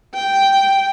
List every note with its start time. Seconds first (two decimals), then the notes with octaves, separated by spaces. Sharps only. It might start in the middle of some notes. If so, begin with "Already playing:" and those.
0.15 G5